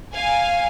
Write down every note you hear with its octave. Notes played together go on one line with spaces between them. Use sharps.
F5 G#5